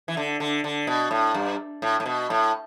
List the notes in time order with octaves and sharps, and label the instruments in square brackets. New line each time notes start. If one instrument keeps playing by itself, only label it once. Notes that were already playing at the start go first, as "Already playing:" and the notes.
[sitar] E3
D3
D3
D3
B2
A2
G2
A2
A2
B2
A2